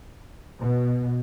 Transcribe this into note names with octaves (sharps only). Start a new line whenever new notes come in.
B2